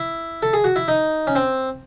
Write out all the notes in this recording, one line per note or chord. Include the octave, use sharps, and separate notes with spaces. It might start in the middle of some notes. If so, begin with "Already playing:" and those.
Already playing: E4
A4
G#4
F#4
E4
D#4
C#4
C4